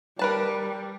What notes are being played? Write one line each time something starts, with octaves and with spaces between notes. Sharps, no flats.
G3 A#4 B4 A5